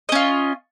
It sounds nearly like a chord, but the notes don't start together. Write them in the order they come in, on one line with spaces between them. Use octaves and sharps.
D#5 C#4 F4